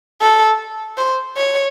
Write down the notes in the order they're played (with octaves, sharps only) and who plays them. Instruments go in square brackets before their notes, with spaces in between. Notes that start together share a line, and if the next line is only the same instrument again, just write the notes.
[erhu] A4
C5
C#5